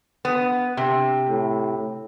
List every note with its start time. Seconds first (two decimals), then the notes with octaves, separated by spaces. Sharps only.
0.25 B3
0.77 C3
1.29 A2